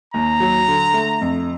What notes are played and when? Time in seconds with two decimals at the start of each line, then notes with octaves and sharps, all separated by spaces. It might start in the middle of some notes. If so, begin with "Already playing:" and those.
0.14 D#2 A#5
0.40 F#3
0.68 D3
0.94 A3
1.21 F2